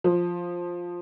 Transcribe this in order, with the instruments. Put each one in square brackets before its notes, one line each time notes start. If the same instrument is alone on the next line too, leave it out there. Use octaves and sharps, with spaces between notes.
[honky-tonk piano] F3